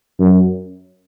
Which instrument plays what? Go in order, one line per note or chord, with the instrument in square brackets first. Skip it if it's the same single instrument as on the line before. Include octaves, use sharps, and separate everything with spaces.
[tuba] F#2